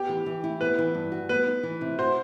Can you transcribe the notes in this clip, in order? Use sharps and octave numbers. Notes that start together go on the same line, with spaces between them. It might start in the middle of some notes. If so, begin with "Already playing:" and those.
Already playing: B3 G4
E3
E3
E4
B3 B4
E3
G2
F#4
B3 B4
D#4
E3
C3
F#4 C5